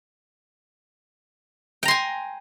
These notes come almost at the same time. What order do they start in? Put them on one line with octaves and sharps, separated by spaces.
G5 A#5 C6 G#5